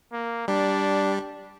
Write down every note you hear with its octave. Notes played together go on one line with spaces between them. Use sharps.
A#3
G3 D4